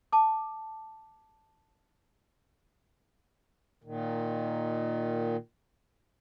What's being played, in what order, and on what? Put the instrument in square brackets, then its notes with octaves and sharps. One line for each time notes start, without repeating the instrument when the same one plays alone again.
[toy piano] A5 D6
[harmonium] A#2 D#3